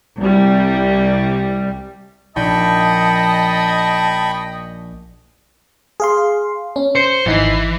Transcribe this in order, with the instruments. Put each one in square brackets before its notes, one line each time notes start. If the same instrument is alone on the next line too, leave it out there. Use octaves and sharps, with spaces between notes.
[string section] C2 G3
[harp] A#1 D#4 B6 [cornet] D#5 [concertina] G5 B5 C#6 [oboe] A5
[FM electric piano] G#4 F5 C6
C#4
[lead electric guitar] C5 [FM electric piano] C#7
[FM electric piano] G#1 D#4 C7 [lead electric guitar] E3